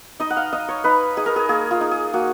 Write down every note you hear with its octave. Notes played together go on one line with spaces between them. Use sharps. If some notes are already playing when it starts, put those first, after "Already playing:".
D#4 D#5
F#5
F5
D#4 D#5
C#5
D#4 B4
D#4 G#4
A#4
G#4
A#3 G#4
F4
D#4
G#4
A#3 F#4